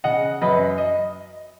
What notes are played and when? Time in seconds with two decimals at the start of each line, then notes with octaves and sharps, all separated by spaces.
0.04 C#3 D#5 F#5
0.41 F#2 B4 D#5
0.78 D#5